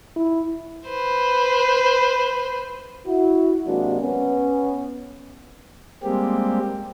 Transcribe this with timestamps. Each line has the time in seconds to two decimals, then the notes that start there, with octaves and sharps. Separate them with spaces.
0.16 E4
0.89 B4 C5
3.08 E4 F#4
3.66 C3 F#3 G#3 A#3 D4 F#4
4.02 B3 C#4
6.03 G3 G#3 A#3 C4 G4